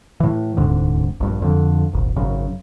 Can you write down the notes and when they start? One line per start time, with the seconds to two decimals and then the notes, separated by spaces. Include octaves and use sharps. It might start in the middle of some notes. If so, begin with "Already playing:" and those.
0.20 A2 E3
0.57 D1 C2 G#2 D3
1.20 A#1 G2
1.42 F2 D3
1.93 D#1 G#1
2.16 G#1 F#2 C#3